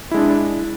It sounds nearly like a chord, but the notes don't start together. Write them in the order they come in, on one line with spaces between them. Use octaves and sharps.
E4 G#3 D4